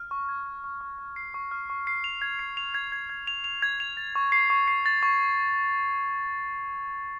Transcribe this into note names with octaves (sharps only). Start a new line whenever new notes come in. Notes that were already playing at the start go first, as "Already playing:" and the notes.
Already playing: F6
C#6
G#6
C#6
C#6
C#6
C#6
C7
C#6
F6
C#6
C7
F7
G#6
C7
F7
G#6
G#6
G#6
F7
F7
G#6
F7
A6
C#6
C7
C#6
C7
A6
C#6